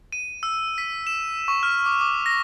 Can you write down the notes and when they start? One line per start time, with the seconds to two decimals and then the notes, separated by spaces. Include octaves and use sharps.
0.12 D#7
0.43 E6
0.78 B6
1.07 E7
1.48 C#6
1.63 F6
1.86 D6
2.01 D6
2.26 A#6